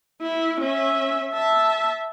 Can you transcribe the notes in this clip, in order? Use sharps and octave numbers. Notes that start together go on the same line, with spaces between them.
E4
C#4 E5
E5 A5